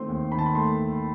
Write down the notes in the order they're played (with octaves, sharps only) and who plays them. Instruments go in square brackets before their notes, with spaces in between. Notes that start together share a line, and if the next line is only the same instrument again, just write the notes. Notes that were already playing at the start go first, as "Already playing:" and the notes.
Already playing: [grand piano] D#3 A3 C4 C6
D#2
D#3 B5
A5
B5
A3 C6